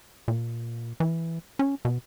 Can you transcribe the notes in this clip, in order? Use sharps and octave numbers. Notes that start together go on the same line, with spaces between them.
A#2
E3
C#4
B2